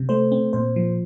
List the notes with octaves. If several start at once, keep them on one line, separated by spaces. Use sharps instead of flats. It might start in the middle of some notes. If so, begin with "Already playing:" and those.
Already playing: C3
A3 C5
C4
A#2 C5
F3